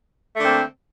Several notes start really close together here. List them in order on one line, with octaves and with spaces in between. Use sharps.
A3 D3 A#3 C4